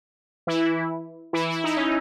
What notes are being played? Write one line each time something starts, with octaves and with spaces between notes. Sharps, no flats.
E3 E4
E3 E4
E4
D#4
C#4